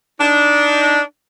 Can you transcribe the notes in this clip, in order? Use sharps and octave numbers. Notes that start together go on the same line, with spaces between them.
D4 D#4